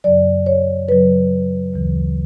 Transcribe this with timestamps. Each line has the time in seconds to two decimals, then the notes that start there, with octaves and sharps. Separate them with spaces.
0.04 F#2 C#3 F#3 D5
0.46 C#5
0.88 F#2 C#3 F#3 B4
1.74 D2 C#3 E3